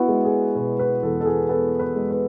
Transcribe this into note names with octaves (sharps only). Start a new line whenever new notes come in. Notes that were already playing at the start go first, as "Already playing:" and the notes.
Already playing: B3 E4 F#4
G#3
G#4
B2 B4
B4
E2 A4
A4
G#4
B3 A4
B4
G#3
B4